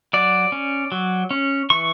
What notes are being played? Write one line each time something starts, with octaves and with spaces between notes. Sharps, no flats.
F#3 D5
C#4
F#3
C#4
E3 C#6